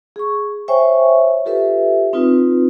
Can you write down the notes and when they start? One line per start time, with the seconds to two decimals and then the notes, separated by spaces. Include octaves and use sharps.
0.16 G#4 C#6
0.68 C5 C#5 E5 G5 G#5 C#6
1.45 F4 G4 A4 B4 E5
2.13 C4 D#4 F4 B4